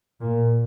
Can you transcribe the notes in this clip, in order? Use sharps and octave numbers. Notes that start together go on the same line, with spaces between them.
A#2